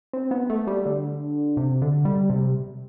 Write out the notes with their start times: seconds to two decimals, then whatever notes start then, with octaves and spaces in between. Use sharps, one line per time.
0.13 C4
0.31 B3
0.50 A3
0.67 G3
0.86 D3
1.57 C3
1.82 D3
2.05 G3
2.30 C3